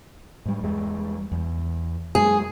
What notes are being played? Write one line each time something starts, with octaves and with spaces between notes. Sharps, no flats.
G#2 G3
E2 G3 G#3
E2
F#2 G#3 A#3 G#4